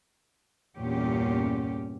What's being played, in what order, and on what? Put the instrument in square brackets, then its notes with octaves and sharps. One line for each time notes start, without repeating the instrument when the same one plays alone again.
[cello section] E2 G2 A#2 C#4 G4